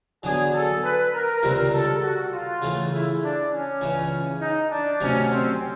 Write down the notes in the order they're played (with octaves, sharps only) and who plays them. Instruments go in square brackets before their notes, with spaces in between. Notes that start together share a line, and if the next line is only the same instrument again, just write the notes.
[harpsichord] D3 F#3 B3 D4 [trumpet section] G#4
[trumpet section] A4
B4
A#4
[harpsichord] C#2 C3 D#3 G3 C4
[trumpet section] A4
F#4
F4
[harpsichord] C#3 E3 A3
[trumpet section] E4
D4
C#4
[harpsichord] C#2 C#3 E3
[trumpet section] D#4
D4
[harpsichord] D2 C3 D#3 F#3 [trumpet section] C#4
[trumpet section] C4